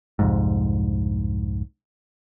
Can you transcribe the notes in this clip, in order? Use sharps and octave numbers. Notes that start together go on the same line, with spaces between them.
C2 F2 G#2